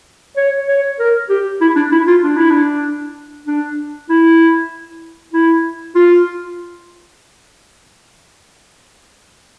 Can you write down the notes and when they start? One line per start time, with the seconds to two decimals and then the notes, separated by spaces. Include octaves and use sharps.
0.37 C#5
0.68 C#5
0.99 A#4
1.30 G4
1.61 E4
1.76 D4
1.92 E4
2.07 F4
2.23 D4
2.36 E4
2.50 D4
3.47 D4
4.10 E4
5.33 E4
5.95 F4